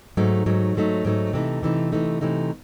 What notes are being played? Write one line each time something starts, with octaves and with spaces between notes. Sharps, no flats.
G#2 F#3 A3 D#4
G#2 F#3 A3 D#4
G#2 F#3 A3 D#4
G#2 F#3 A3 D#4
C3 E3 A3 D#4
C3 E3 A3 D#4
C3 E3 A3 D#4
C3 E3 A3 D#4